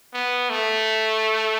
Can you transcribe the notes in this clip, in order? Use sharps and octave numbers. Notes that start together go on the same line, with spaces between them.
B3
A3